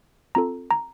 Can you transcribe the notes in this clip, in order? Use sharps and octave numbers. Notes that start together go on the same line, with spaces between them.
C4 F4 A4 A#5
A#5